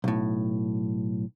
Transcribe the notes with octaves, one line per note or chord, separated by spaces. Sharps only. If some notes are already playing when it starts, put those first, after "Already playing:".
B1 A2